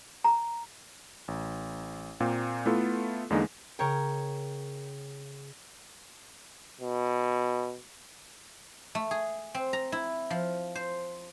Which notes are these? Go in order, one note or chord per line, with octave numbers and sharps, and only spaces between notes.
A#5
A1
A#2 A#3 C4
A3 B3 E4 F4 A4
E2 D3 G#3 A#3 D#4
C#3 A#4 C#5 G5
B2
A3
G#4
C4
A#5
E4
F3
C5